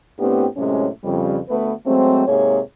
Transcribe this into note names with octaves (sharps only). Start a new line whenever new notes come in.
A2 A3 B3 C4 D4 G4
F#2 A2 C3 G#3 C#4
F2 C#3 G3
D2 A3 B3 B4
F#3 G#3 A3 C4
G#2 C3 A#3 G#4 C#5